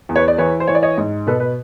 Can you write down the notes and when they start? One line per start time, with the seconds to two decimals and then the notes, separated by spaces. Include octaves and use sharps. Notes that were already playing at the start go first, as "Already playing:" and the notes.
0.09 E2
0.16 B4 C#5
0.28 D5
0.38 E3 B4 C#5
0.60 C5
0.67 E3 C#5
0.75 D5
0.83 C#5 D#5
0.98 G#2
1.27 B2 A4 B4
1.40 B4